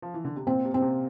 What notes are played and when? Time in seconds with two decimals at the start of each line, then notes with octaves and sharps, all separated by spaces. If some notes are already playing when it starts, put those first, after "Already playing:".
0.02 F3
0.14 E3
0.24 D3
0.36 C3
0.47 A#2 C4
0.65 C3
0.74 C4
0.82 C3